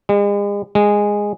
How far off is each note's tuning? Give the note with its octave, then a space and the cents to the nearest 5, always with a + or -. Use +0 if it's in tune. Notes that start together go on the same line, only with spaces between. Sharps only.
G#3 -40
G#3 -10